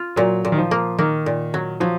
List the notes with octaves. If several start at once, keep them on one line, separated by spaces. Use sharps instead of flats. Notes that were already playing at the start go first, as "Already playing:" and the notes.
Already playing: F4
A#2 F#3
A#2
D#3
F3
A#3
D#3 A#3
A#2
F#3
F3 F#3